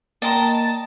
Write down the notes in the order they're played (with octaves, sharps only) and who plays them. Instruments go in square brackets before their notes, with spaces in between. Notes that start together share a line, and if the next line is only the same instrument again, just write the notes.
[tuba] A#3 [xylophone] D5 G5 C6 [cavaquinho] D#5 A#5 [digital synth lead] A5